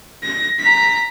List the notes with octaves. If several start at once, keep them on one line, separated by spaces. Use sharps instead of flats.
A#6
A#5 B6